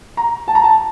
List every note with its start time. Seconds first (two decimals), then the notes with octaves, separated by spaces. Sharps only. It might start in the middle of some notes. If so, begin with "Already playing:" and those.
0.17 A#5
0.48 A5
0.55 A#5
0.64 A5